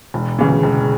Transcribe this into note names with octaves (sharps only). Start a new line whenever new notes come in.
E1
D2 C#3 E3
E1